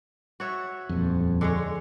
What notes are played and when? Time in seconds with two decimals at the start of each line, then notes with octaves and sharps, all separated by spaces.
0.40 F#4 C#5 E5
0.89 D#1 F2
1.41 D3 G#3 C#5